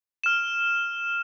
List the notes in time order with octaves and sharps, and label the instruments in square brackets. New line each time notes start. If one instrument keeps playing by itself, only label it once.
[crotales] F6 E7